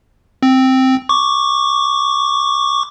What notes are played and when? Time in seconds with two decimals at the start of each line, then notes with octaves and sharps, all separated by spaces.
0.43 C4
1.09 C#6 D6